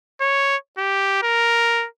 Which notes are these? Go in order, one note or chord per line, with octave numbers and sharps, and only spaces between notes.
C#5
G4
A#4